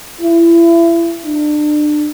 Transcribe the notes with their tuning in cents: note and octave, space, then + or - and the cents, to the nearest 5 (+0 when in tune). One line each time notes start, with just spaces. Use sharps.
E4 +30
D4 +30